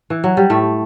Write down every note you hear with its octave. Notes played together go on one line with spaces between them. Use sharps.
E3
F#3
G3
A2 A3